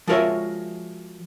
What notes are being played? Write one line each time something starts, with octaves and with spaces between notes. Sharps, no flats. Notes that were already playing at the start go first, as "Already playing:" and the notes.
F3 G#3 F#4 A#4 C#5 E5